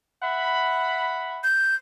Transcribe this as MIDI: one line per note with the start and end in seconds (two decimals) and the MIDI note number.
0.23 1.43 76
0.23 1.43 78
0.23 1.43 83
1.44 1.75 91